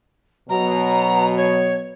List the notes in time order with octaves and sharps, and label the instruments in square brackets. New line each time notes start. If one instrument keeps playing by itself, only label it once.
[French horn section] B2 F#3 [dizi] A#5
[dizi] C#5